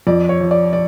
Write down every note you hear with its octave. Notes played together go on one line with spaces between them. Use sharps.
F2 D5
C#5
F3
D5
D5